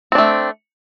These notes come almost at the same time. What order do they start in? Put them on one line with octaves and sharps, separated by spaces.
C4 D4 A3